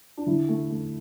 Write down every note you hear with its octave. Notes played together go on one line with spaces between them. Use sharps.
D4
D3 E4
A3
A3